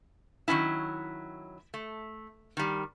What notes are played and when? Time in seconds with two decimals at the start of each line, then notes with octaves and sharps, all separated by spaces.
0.48 D#3 F#3 G3 C#4 E4
1.74 A3
2.57 D#3 G3